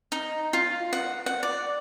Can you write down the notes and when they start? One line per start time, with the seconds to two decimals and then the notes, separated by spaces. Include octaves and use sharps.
0.12 D#4
0.53 F4
0.93 F#5
1.26 F#5
1.43 D5